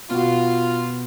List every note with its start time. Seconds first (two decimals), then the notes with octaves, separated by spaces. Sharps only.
0.10 B2 F4 F#4